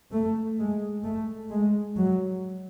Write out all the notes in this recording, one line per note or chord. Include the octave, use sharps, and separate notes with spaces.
A3
G#3
A3
G#3
F#3